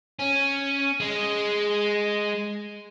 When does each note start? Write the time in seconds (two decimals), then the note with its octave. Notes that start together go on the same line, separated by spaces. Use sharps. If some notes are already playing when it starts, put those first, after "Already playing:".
0.19 C#4
1.00 G#3